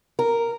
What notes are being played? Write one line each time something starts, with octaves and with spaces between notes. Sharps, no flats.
A#4